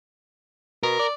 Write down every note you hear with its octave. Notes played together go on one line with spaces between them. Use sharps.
B2 A#4
D5